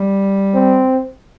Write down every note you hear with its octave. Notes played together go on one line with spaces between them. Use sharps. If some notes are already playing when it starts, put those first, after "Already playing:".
Already playing: G3
C4